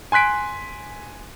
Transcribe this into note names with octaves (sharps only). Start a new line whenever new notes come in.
G#5 C6 F#6 B6 D7